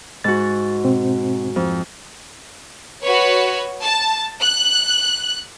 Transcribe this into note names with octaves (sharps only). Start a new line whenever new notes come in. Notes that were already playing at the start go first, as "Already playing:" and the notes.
G#2 F#4 A6
B2 C4
F2
F#4 B4 C#5
A5
F#6